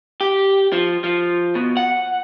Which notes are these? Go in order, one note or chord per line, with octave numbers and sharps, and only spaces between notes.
G4
F3
F3
B2
F#5